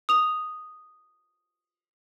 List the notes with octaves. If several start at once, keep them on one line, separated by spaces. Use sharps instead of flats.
D#6 F7